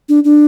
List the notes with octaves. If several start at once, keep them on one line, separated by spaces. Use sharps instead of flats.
D4
D4